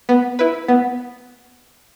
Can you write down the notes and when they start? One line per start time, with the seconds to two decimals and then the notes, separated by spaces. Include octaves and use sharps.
0.09 B3
0.39 E4 B4
0.68 B3